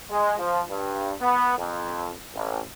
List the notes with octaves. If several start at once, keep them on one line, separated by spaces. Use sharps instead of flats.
G#3
F3
G2
B3
F2
A1